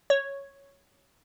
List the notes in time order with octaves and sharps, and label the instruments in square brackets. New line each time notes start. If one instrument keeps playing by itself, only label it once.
[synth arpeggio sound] C#5